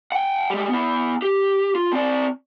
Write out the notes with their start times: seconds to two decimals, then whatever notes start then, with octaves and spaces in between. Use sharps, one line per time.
0.12 F#5 G5
0.50 G3 G#3
0.70 B3 E4
1.22 G4
1.75 F4
1.93 C4 D5